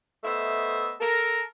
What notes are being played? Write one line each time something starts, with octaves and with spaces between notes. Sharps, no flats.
A3 B3 C5 D#5 E5
A4 A#4